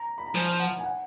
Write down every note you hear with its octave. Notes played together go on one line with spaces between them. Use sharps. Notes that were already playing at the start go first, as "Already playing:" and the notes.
Already playing: A#5
B5
A#5
F3 G#5
F#5
G#5
F#5